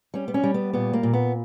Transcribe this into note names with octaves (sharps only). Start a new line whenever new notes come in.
G3 C#4
B3
C#4
G3
B3
A#2 B3
A#3
A#2
B3